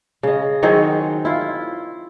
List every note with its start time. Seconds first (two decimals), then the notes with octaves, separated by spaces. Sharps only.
0.23 C#3 D#5
0.63 D#3 F#3 C4 G#4
1.25 E4 F4